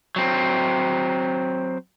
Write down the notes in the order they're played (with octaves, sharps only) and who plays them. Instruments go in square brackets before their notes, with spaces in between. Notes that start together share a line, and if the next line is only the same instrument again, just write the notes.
[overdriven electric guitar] F#3 C4